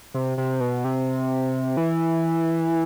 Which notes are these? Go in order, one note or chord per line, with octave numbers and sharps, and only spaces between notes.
C3
C3
B2
C3
E3